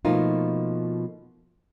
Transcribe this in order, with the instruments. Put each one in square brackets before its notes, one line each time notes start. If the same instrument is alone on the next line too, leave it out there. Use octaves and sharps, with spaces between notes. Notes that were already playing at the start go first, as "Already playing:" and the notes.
[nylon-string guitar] B2 F3 A3 A#3 D#4 F4